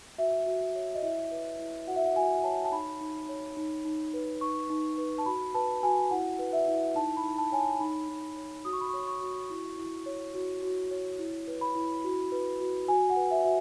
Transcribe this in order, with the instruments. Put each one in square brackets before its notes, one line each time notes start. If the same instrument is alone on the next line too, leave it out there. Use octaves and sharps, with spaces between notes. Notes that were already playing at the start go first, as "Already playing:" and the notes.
[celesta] F#4 E5
F#4
C#5
D#5
E4 E5
B4
E4
F#4 F#5
E5
F#5
F#4 G#5
C#5 A5
A5
D#4 B5
D#4
C#5
D#4
D#4
B4
D#4 C#6
D#4
B4
A5
F#4 B5
B4 A5
F#4 G#5
E4 F#5
B4
E5
E4
D#4 A5
B5
D#4
A5
C#5 G#5
A5
D#4 B5
D#4
C#5
F#4 D#6
C#6
B5
C#5 C#6
C#6
F#4
E4
E4
C#5
F#4
F#4
C#5
E4
B4
B5
E4
F#4
B4
F#4
F#4 G#5
F#5
B4
E5
F#4 E5